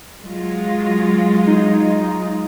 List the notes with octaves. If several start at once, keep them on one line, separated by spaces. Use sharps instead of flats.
F#3 G#3 F4
D#4